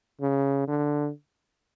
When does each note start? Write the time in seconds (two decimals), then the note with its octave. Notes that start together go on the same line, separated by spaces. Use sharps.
0.21 C#3
0.67 D3